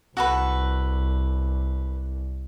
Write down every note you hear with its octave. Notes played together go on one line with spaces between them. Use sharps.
C2 F#4 A4 B4